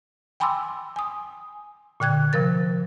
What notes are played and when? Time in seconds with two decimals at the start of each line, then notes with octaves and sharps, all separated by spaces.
0.40 G5 G#5 B5 C6 D6 E6
0.96 G#5 D#6
2.00 A#2 D3 G5 F#6 G#6
2.33 C3 F3 A#4 A6